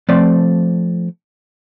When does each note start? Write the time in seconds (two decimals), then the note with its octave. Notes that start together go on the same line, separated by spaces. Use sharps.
0.09 F3 A3 C4 D5